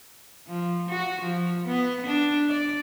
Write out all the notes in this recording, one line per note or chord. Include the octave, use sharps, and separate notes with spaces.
F3
F#4
F3
B3
D4
D5